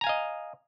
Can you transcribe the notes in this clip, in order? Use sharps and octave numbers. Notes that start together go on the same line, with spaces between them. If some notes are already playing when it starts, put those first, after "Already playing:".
D#5 F5 G#5 A#5